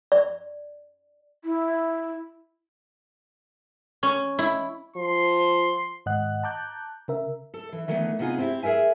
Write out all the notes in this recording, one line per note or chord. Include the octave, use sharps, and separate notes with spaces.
D5
E4
C#4
E4
F3 C6
G#2 D#3 D#5 F#5 F#6
A5 A#5 D6 F#6 G6
C#3 A#4 E5
A4
E3
D#3 E3 G3 A3 B3 D4
C3 B3 D#4 F4 G#4
C4 E4 G4
G#4 A#4 B4 E5 G#5